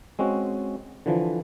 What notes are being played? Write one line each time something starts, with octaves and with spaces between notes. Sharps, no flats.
G#3 C4 C#4 F#4
D3 E3 F3